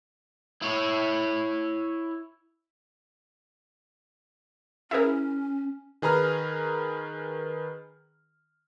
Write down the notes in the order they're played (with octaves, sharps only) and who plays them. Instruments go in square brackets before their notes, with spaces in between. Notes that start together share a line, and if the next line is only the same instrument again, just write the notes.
[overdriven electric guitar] E4 C#5
[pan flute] C#4 [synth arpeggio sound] E4 G#4 A#4
[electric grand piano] D#3 G#4 B4 A#5 F6